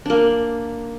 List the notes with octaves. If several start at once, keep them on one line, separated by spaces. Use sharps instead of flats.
A#3 D4